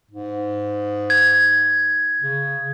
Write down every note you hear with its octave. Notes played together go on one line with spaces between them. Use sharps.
G#2
G#6
C#3